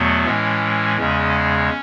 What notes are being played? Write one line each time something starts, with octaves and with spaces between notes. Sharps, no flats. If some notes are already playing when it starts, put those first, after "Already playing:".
Already playing: E2 B2 F#3 A3 B3
A2 E3 G#3 C#4
E2 C#3 G#3 C#4